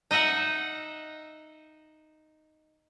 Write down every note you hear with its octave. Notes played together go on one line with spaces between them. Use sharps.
D#4 D#5 E5 F#5 A#5